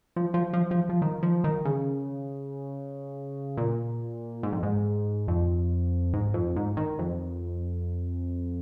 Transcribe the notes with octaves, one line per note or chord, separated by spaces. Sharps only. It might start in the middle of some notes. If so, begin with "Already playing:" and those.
F3
F3
F3
F3
F3
D#3
F3
D#3
C#3
A#2
G#2
F2
G#2
F2
G#2
F2
G#2
D#3
F2